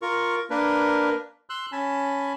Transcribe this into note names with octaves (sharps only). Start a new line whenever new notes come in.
F4 A#4 C#6
A#3 D4 A#4 B4
C6 E6 F#6
C#4 G#5 A5 B5